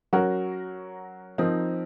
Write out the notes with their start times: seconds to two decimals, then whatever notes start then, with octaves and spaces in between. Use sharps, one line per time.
0.13 F#3 C#4 F#4 A#4
1.38 F3 C4 D#4 A#4